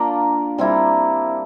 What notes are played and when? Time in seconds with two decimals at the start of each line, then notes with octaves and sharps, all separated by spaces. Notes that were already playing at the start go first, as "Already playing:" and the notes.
Already playing: A#3 D4 F4 A#4
0.58 G3 C4 E4 A#4